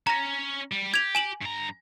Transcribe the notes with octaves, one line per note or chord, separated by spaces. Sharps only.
C#4 A#5 A#6
G3
G4 G#6 F7
G#5 E7 F#7
G2 A#5